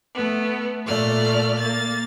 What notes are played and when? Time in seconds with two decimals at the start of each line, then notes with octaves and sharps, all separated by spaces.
0.15 A3 B3
0.86 A#2 A3 D5 F6
1.59 A#3 A6